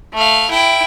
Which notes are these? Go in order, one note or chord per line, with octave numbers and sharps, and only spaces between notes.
A3 F5
E4 G5